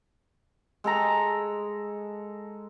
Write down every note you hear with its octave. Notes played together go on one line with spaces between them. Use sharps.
G#3 A4 A#5